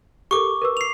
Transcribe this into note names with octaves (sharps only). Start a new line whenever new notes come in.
G4 A4 A#4 C#6 D6
A#4 B4 E6
C7 F7